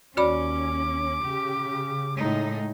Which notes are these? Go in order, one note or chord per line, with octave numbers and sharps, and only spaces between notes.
D#2 C#4 F#4 D5 B5 D6
C#3 G4
A2 G#3 D#4